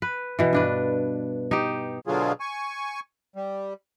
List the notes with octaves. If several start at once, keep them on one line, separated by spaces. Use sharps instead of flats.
B4
B2 E3
G2 D4 B4
D#4 G4
B2 D3 F#3 F4 G#4
G#5 C#6
G3